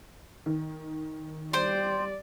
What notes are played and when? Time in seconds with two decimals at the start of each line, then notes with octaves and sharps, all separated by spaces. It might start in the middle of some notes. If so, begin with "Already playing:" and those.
0.46 D#3
1.53 G3 C5 D5 G5 C6